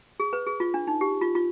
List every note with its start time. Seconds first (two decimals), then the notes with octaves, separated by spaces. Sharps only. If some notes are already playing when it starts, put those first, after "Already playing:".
0.20 G#4
0.33 B4
0.47 G#4
0.60 F4
0.74 D4
0.87 D#4
1.01 G4
1.21 F4
1.35 F4